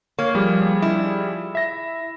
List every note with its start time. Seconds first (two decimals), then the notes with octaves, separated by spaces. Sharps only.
0.19 A#3 C#5
0.35 F3 G3 G#4
0.82 E4
1.55 E5 A#6